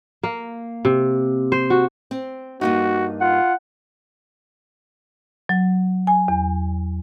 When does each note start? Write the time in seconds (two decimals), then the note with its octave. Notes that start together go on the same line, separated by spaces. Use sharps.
0.23 A#3
0.85 C3
1.52 C5
1.70 F#4
2.11 C4
2.61 G2 A#3 D#4 F#4
3.21 F4 F#5
5.49 F#3
6.07 G#5
6.28 E2